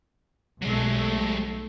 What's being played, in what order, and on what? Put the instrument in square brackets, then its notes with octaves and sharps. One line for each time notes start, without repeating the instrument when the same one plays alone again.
[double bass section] B1 A3 [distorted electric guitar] F#3 G#3